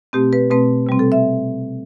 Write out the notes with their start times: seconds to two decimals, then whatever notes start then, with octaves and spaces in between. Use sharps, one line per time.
0.13 B2 A3 C4 G4
0.33 B4
0.51 B2 A3 C4 B4
0.87 C3 G3 C4
0.99 A4
1.12 E5